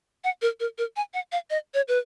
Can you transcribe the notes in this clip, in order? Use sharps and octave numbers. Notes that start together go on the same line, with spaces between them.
F#5
A#4
A#4
A#4
G#5
F#5
F5
D#5
C#5
B4